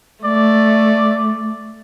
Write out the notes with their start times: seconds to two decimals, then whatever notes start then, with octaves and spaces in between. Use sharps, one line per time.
0.25 A3 D5